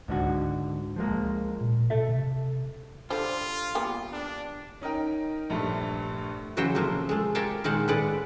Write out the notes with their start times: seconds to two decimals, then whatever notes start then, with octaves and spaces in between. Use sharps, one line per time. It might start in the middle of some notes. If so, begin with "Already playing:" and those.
0.08 C#2 G#2 D3 F#4
0.96 F3 G#3 A#3
1.60 A#2
1.90 B2 A4 E5
2.09 C3
3.10 D3 G3 F4 C5
3.75 G3 A#3 B3
4.12 D4
4.81 C#4 D#4 A#4 G5
5.50 A#1 G2 A3 G4
6.57 C#3 E3 F#3 F#4 C5 G5
6.75 A2 C3 F3 A#3
7.09 G#3 A3
7.35 G4 A#4 C#5 F5 G5 A5
7.64 A#2 D#3 G#3 C5 F5 F#5
7.88 A2 G#3 B4 D5 F#5